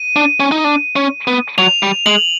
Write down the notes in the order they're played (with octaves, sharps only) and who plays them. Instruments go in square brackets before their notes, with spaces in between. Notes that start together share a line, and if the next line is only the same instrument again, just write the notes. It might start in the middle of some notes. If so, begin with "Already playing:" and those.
Already playing: [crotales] D#7
[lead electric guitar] D4
C#4
D#4
D4
C#4
B3
[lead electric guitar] F#3 [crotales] F7
[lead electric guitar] G3
[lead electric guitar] G#3 [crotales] F#7